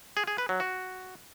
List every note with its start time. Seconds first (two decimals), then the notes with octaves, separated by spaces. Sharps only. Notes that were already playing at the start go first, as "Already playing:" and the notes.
0.17 G#4
0.27 G#4
0.38 B4
0.49 F#3
0.60 F#4